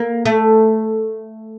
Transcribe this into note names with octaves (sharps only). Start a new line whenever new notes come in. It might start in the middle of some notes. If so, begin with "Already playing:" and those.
Already playing: A#3
A3